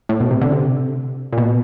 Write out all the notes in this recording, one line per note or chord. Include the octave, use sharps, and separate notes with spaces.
A2
B2
C3
D3
C3
A#2
B2